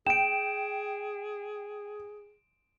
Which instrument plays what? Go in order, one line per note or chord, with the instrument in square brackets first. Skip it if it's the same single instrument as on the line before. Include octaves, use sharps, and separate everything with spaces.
[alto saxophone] G#4 [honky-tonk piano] G5 [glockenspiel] D7 E7